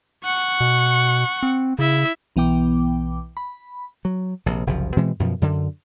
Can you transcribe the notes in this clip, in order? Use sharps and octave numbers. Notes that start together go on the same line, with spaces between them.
F#5 C#6
B2
C4
C#3 E4 E5
B1 E3 B3 G5 D6
B5
F#3
A#1 C3
F#1 C2 C#3 F3
B2 E3 G#3 C4
F#2 B2 F3
F#2 D3